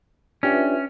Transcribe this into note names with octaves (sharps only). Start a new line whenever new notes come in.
C#4 D4 F4 G4 B4 E5